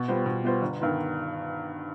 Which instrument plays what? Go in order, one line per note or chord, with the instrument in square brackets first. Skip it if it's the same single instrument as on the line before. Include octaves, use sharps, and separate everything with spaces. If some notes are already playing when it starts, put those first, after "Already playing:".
Already playing: [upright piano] B2
G3 B3 F4 C5
B2
G3 B3 F4 C5
G1
G2 D#3 B3